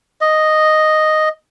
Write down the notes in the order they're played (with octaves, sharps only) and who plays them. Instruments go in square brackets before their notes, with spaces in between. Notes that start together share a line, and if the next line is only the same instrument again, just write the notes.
[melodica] D#5